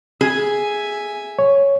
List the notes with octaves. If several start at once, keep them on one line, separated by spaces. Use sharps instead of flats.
G#4 E5 G#5
C#5